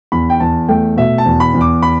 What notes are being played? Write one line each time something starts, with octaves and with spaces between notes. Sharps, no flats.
E2 B5
G5
E2 A5
A3 G5
B2 E5
A5
E2
B5
E2
D6
B5